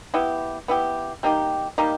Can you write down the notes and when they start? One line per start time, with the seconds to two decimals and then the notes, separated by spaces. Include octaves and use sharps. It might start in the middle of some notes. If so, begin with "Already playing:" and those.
0.14 B3 E4 G4
0.68 B3 E4 G4
1.23 G3 A#3 D#4 G4
1.78 G3 A#3 D#4 G4